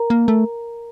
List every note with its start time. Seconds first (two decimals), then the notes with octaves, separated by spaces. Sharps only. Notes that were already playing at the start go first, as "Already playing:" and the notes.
Already playing: A#4 A#5
0.10 A#3
0.28 A3